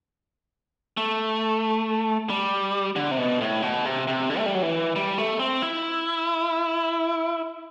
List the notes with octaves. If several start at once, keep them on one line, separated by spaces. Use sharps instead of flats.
A3
G3
D3
C3
B2
A2
B2
C3
C3
D3
A3
G3
F#3
E3
G3
A3
C4
E4